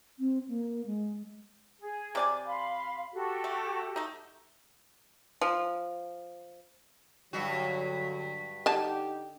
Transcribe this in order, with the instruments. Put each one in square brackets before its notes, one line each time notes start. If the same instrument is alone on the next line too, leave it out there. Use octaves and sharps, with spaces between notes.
[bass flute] C4
A#3
G#3
[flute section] G#4
[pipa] C3 D5 G#5
[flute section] F5 B5 C6
F#4 G4 A4
[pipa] A3
A3 D#4
F3
[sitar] G2 F#4 [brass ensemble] D3 F#3
[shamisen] D3 A5 [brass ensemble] D#4 G4